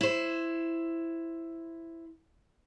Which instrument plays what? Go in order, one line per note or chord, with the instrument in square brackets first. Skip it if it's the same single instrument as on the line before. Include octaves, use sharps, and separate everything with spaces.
[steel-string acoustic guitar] E4 C5